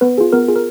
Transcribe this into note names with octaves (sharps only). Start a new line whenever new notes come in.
B3 B4
F4 G#4
B3 A#4
F4 G#4
A#4